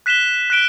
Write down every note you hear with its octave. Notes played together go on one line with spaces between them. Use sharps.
F#6 B6 E7 G7
F#6 B6 D7 G7